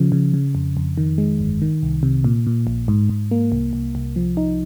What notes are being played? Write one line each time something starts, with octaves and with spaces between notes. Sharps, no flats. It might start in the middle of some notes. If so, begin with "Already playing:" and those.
Already playing: C#3 F3
C#3
C#3
F2
F2
D#3
G#3
G1
D#3
C2
C3
A#2
A#2
A#1
G#2
G#2
A#3
C2
C2
C2
F3
D#4